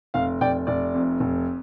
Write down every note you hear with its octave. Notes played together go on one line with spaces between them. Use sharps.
F1 F5
F1 D5 G5
F1 D5
F2
F1